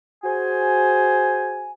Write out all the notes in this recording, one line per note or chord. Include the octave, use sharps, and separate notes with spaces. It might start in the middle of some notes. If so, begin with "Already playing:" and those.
F#4 G#4 C5 G#5